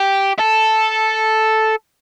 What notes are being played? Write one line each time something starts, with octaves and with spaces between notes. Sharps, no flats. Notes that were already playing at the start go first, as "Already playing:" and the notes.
Already playing: G4
A4